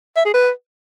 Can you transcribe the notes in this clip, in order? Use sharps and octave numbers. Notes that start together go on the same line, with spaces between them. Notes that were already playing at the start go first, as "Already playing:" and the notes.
E5
G#4
B4